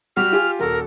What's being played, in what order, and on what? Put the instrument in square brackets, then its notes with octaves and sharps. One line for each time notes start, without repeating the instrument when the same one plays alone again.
[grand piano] G3 F#4 G4 [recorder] F6
[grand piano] F4 G4 G#5
[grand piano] D#1 F#4 A4 [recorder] A#4